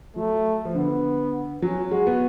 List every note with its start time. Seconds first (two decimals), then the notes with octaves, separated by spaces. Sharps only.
0.16 F#3 A3
0.65 F3
0.75 D3 B3
1.62 F#3 C#4
1.91 G#3 F#4
2.07 B3